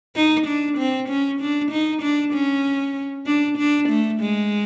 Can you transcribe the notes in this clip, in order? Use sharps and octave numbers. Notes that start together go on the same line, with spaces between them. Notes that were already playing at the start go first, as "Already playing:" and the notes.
D#4
D4
C4
C#4
D4
D#4
D4
C#4
D4
D4
A3
G#3